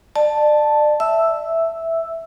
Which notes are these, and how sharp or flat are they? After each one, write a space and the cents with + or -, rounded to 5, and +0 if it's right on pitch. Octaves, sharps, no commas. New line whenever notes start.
D5 +35 A5 +0
E5 +0 E6 +0